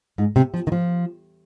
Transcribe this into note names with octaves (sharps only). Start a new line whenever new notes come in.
G#2
C3
F3
D#3
F3